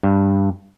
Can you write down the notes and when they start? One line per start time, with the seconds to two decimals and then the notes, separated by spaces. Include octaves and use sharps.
0.03 G2